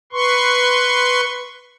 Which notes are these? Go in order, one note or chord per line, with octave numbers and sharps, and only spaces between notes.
B4 C6 C#6